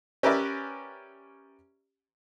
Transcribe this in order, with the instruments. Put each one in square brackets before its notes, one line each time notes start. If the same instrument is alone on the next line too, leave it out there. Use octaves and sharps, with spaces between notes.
[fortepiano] C#4 G4 A#4 B4 D5 E5